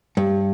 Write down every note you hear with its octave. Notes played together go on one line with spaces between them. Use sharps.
G2